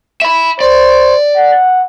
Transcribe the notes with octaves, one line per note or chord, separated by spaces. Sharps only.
E5 B5
C5 D5
F#5